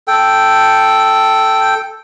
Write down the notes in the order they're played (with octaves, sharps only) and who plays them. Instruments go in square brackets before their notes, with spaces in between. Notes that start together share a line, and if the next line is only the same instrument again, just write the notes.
[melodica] A4 G5